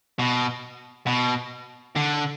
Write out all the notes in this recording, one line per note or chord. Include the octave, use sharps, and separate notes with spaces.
B2
B2
D3